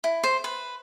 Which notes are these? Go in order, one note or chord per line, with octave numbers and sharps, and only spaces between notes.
E4
C5
B4